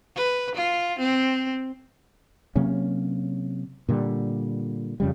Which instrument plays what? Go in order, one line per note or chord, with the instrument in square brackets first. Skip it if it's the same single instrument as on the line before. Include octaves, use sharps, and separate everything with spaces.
[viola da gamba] B4
F4
C4
[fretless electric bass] C3 F#3 A#3 C#4
A#2 D3 G3
F2 C#3 G3